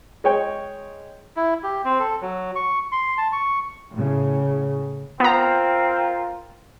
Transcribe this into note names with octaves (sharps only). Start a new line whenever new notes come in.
G#3 C#5 G5
E4
G4
C4
A4
F#3
C#6
C6
A5
C#6
A2 C#3
B3 C4 F4 A#4 A#5